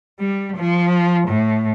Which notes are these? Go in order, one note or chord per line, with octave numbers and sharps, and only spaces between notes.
G3
F3
A2